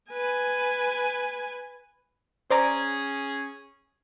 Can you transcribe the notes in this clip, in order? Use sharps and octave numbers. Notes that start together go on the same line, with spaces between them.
B4 G#5
C#4 G#4 C5 D5 A#5